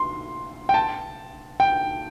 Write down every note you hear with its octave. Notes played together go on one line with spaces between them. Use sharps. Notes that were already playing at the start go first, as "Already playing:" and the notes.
Already playing: C6
G5
A5
G5